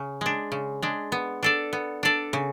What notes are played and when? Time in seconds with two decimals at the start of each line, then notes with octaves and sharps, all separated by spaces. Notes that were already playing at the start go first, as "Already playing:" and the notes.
Already playing: C#3
0.21 G#3 D4
0.52 C#3
0.82 G#3 D4
1.12 B3
1.43 D4 A4 D5
1.73 B3
2.03 D4 A4 D5
2.33 C#3